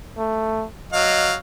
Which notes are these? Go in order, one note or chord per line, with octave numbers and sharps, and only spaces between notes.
A3
F#3 D#5 F5